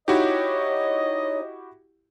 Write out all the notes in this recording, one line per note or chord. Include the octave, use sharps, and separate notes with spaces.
D#4 E4 F#4 G4 C#5 D#5